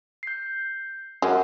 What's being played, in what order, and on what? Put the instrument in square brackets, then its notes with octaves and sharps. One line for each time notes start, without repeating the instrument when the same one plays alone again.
[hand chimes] G6 C7
[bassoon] F#2 [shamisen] G#3 [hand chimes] F#5